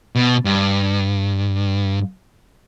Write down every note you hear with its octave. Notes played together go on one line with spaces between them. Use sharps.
B2
G2